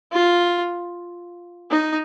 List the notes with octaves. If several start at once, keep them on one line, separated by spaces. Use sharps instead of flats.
F4
D#4